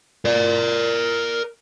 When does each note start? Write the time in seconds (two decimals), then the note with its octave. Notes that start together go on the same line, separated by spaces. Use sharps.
0.25 A#4 D5